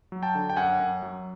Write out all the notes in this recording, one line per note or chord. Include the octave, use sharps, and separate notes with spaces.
F#3
G5 A5
D3
G5
F#2 F#5 G#5
F#2
F#3